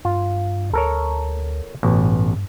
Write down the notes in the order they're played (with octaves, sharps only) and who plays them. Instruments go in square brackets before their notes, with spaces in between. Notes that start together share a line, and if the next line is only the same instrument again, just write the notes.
[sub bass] G2 [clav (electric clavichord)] F4
[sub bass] D2 [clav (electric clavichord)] A4 A#4 C#5
[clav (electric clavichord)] A1 B2 [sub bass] G2